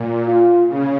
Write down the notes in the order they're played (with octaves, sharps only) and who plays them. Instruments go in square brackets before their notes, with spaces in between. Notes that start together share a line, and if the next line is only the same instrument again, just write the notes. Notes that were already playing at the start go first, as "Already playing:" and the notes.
Already playing: [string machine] A#2
[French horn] F4
[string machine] C#3